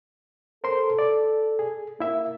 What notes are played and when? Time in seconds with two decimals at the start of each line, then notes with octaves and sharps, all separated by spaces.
0.64 A4 A#4 C5 C6
0.99 D5
1.59 G#4
2.00 A#3 E4 E5